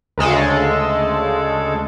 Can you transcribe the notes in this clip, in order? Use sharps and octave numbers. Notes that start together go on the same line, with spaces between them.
D2 C#3 G#3 A4